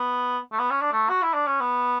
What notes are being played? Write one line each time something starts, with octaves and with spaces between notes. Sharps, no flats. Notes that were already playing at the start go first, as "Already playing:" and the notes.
Already playing: B3
A3
B3
C#4
D4
A3
F#4
E4
D4
C#4
B3